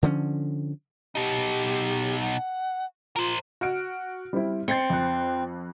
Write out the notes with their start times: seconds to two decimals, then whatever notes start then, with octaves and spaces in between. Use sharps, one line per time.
0.03 D3 F3 A#3 C#4
1.15 B2 D#4 G4
2.21 F#5
3.16 F4 A#4 C5
3.61 F#4 F6 D7
4.33 G3 C4 E4
4.68 C4 A6 C7 C#7
4.90 F2 F#6